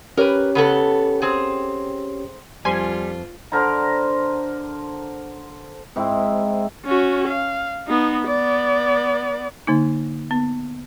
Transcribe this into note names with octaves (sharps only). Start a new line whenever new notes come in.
C#4 G4 A#4 B4 C#5
C#3 B3 A4
C4 G#4
F2 G3 F4 G#5 C6
D3 A#4 C5 B5
G#2 C4 E4
C#4 F#4
F5
B3 D#4
B3 D5
D3 A#3 D#4
B3